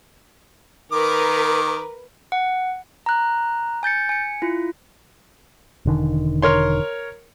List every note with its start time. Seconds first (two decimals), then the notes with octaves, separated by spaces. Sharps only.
0.92 D#3 A#4 B4 D6
2.32 F#5
3.06 A#5 F#6
3.83 G#5 G6 A6 C#7
4.09 G#5 C#7
4.42 E4 F4
5.86 E1 D3 D#3
6.42 A#4 C#5 C6